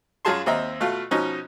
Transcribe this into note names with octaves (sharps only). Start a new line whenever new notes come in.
F#2 F#3 F4 G#4 A5 C6
D#2 C4 D#5 E5 A#5
B2 A3 F4 F5
B2 F3 C#4 D#4